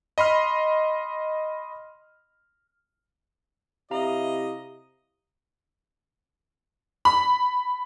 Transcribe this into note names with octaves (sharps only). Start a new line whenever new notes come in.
D#5 B5 C6 F6
C3 E4 D#5 F5 A#5
B5